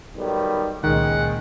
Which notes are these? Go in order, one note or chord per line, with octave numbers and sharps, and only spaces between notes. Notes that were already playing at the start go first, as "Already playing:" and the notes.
B1 D#3 G3
C#2 A#2 D#3 G#3 F#5